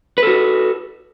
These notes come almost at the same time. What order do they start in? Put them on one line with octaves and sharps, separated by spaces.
B4 A4 F#4